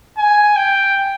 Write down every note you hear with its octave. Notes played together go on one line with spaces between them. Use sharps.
G#5
G5